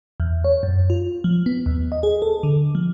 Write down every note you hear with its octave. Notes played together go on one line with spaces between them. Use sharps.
E2
C#5
F#2
F4
F3
B3
D#2
D#5
G#4
A4
D3
F3